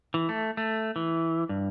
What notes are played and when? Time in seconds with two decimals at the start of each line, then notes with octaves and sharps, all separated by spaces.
0.14 E3
0.29 A3
0.57 A3
0.96 E3
1.49 G2